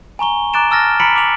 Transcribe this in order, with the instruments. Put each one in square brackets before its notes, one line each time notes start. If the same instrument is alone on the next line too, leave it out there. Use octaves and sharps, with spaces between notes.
[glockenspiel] G#5 A#5 C#6 G7
A#5 D6 F#6 A6 D7 E7
A5 E6 F6 A6 A#6
A#5 B5 B6 C#7 D7 F#7
D6 F7 F#7